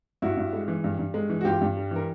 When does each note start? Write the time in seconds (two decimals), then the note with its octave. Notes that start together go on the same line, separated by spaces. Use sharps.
0.22 G2 E4 F#4
0.37 G2
0.53 G#3
0.68 E3
0.84 G2
0.99 G2
1.14 G#3
1.30 E3
1.41 F#4
1.45 G2 F4 G4
1.61 G2
1.77 G3
1.91 E3 A#4